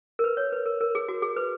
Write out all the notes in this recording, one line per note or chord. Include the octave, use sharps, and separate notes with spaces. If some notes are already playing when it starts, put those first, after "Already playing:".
A#4
B4
C#5
B4
A#4
A#4
G#4
F#4
G#4
B4